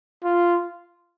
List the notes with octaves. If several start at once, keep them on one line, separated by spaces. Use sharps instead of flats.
F4